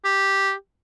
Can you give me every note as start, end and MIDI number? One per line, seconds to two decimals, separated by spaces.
0.05 0.52 67